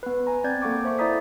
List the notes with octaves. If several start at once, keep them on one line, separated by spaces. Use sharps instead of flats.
B3 B4
G#5 A#5
C4 D5 G6 G#6
A#3 A4 F#5 C#6 D6
C5 E5 C#6
E4 D5 E5 A#5 D#6 B6